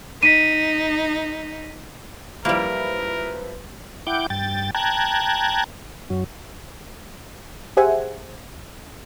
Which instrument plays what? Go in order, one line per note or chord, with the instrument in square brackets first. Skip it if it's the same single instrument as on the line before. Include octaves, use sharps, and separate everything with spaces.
[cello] D#4 [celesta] B6 D#7
[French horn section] F#2 B4 [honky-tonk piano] F3 E4 B5 [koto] G3 A#3 [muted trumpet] A#4
[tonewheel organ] E4 F#5 G5 D6 G6
G2 G5 A6
G5 A5 A#5 F#6 G#6
F#2 F#3
[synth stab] G4 G#4 C5 E5 F#5 G#5